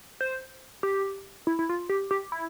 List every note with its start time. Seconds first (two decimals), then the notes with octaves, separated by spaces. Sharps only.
0.21 C5
0.83 G4
1.47 E4
1.59 E4
1.69 F4
1.89 G4
2.11 G4
2.32 E4